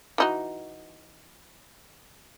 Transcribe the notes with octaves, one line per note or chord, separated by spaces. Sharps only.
E3 D#4 F#4